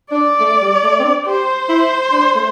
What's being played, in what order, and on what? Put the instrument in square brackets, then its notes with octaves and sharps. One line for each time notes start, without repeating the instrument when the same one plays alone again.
[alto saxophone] D4 [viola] D5
[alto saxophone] A3
G3
A3
C4
D4
[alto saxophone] G4 [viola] C5
[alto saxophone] E4
D4
A3